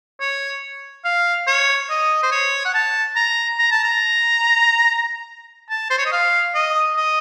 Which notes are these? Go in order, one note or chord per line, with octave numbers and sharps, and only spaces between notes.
C#5
F5
C#5
D#5
C5
C#5
F#5
A5
A#5
A#5
A5
A#5
A5
C5
C#5
D#5
F5
D#5
D#5